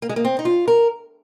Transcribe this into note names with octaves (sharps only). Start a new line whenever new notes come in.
A#3
G#3
A#3
C4
D#4
F4
A#4